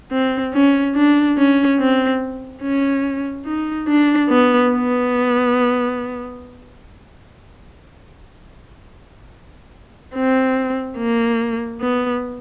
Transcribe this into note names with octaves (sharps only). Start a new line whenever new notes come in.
C4
C#4
D4
C#4
C4
C#4
D#4
D4
B3
B3
C4
A#3
B3